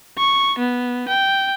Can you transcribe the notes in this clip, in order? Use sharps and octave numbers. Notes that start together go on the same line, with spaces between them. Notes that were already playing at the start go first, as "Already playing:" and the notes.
C#6
B3
G5